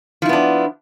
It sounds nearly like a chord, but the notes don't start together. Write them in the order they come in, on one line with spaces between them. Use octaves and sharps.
F3 E4 B3 D4